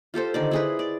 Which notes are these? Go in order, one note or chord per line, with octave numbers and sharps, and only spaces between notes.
F4 G4 A4 C5
D3 D#3 D5
E4 G#4 B4
D5